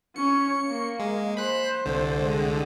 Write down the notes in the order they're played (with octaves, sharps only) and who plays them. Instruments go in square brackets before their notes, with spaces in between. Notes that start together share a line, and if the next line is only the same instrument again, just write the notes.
[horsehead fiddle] C#4 C#5 [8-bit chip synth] C#7
[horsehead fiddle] A#3
[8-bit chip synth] G#3
[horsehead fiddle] C5 [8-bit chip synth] B5 F#6
[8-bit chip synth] C2 D3
[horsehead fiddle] G#3